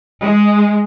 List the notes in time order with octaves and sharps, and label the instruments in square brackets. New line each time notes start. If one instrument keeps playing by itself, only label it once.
[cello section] G#3